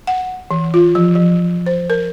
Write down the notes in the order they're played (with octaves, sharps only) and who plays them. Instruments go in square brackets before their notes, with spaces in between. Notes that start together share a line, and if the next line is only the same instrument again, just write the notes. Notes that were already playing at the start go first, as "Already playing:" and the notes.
[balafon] F#5
E3
F4
F3
F3
C5
A#4